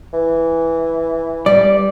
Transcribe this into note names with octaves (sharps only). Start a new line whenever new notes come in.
E3
G3 D5